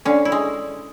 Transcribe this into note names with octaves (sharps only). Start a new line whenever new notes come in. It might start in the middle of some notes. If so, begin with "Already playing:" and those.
D3 C#4
E4
G#3